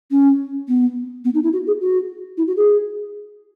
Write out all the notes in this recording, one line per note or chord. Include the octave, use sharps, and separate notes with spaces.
C#4
B3
B3
D#4
E4
F#4
G#4
F#4
E4
F#4
G#4